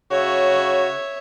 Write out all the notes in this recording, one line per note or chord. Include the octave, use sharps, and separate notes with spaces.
C#3 F#4 C#5 E5